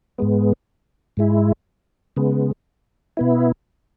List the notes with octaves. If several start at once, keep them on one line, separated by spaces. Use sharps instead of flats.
G#2 G#3 B3
G#2 G#3 E4
C#3 G#3 B3
B2 B3 E4